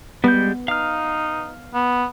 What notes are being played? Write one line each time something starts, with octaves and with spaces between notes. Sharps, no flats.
G3 G#3 B3 G6
D#4 F5 F6
B3